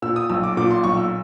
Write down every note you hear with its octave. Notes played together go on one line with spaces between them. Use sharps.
A#2 E6
D#6
B1 E6
D6
A#2 D6
C6
B1 C#6
E6